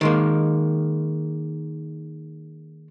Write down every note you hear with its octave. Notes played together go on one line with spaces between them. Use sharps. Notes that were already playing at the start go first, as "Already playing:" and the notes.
D#3 G#3 A#3